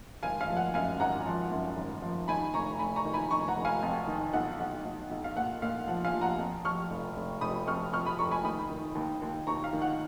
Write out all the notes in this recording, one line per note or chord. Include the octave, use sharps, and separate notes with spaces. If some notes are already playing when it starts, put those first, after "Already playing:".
G#1 F5 G#5
F5 G#5
F3
F#5
F#2 F5 G#5
G#1 F#5 A#5
F3
F#2
G#1
F3
D#3 G#5 B5
F1 A#5 C#6
F1 G#5 B5
A#5 C#6
D#3
G#5 B5
F1 A#5 C#6
F#5 A#5
F1
F5 G#5
F2
D#3
B1 F#5
B1 F#5
B1
B1
F5
A#2 F#5
A#2 F5
F3 F#5
F5 G#5
F3
F#5 A#5
F2
F3 C#6 F6
F1
F1
F1 B5 D#6
F2 C#6 F6
F2 C#6 F6
B5 D#6
F1 A#5 C#6
G#5 B5
D#3 B5 D#6
D#3
D#2
D#2
D#2 A#5 C#6
F5
D#3
F#5